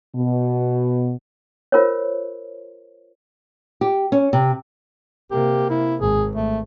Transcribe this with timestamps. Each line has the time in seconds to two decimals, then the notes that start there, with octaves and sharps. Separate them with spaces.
0.16 B2
1.72 F4 A#4 C5 C#5
3.81 G4
4.12 C#4
4.33 C3
5.31 C3 A#3 G4
5.70 E4
6.00 G#1 G#4
6.35 A3